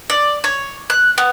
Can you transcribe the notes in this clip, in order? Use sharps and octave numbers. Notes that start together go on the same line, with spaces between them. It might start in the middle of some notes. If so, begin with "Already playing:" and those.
D5
C#5
F#6
B3